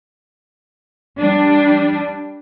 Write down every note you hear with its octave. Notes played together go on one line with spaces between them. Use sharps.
G3 D4